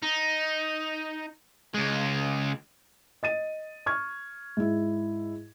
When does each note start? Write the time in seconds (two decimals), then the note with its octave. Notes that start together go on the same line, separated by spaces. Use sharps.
0.02 D#4
1.74 C#2 G#3
3.23 D#5 A6 D#7
3.86 C#6 F6 G#6
4.57 G#2 E4